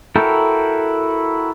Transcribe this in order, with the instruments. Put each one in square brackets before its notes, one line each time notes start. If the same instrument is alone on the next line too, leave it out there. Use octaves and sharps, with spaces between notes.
[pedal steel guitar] E4 F#4 A4 A#4 G5